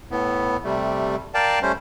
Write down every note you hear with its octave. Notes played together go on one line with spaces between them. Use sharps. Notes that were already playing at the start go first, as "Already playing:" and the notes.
A2 B3
C3 G3 A3
A#4 D5 F5 G5 A5
G3 A3 C#4 C5